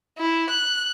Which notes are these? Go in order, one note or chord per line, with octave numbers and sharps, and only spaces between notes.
E4
F#6